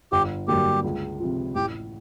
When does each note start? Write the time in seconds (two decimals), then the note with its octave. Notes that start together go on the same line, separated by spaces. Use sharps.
0.12 G1 G4
0.48 G2 D3 F#3 A#3 G4
0.84 C#2
1.20 C3 F3
1.55 A1 G4